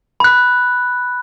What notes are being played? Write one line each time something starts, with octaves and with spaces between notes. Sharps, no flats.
B5 F#6